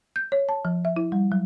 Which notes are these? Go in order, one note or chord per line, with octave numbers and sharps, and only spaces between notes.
G6
C#5
A5
F3
E5
E4
G3
F#3